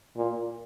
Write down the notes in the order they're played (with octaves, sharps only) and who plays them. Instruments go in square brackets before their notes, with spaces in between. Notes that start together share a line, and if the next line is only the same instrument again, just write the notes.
[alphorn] A#2